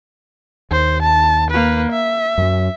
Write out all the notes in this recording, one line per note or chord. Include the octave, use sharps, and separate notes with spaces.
D#2 C5
A5
A#3 B4
E5
F#2 F#3